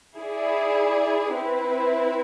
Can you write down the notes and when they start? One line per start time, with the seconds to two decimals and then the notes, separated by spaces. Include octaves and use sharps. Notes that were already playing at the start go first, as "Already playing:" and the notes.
0.17 E4 G#4 D5
1.35 C4 E4 B4